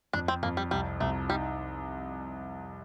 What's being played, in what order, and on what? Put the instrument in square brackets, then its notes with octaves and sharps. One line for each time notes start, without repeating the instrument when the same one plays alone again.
[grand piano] F2 [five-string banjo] D4
[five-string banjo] C4
[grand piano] F2 [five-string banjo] A#3
[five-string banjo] G3
[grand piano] C2 [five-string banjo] G3
[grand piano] C2 [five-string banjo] A3
[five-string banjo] G3 [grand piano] D#4